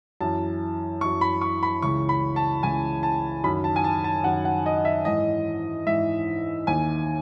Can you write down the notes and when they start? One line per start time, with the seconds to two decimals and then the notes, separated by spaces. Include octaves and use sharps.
0.21 F#2 E3 A5
1.01 F#2 E3 C#6
1.21 B5
1.41 C#6
1.63 B5
1.82 C#2 C#3 E3 C#6
2.09 B5
2.36 A5
2.63 C#2 C#3 E3 G#5
3.03 A5
3.44 F#2 D#3 B5
3.64 A5
3.76 G#5
3.84 A5
4.04 A5
4.24 F#2 D#3 F#5
4.45 F#5
4.66 D#5
4.85 E5
5.05 G#2 E3 D#5
5.87 G#2 E3 E5
6.67 D#2 D#3 G#5